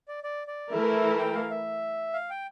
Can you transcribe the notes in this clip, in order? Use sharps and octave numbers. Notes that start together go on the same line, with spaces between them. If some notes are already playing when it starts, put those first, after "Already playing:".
D5
D5
D5
E3 A3 E4 A#4 E5
G5
F5
E5
F5
G5